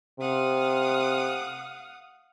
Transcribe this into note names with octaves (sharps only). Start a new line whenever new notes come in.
C3 F5 F#5 D#6